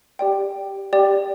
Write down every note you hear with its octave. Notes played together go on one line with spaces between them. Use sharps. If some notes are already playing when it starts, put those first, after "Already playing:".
G4 D5 G5
G4 D5 G5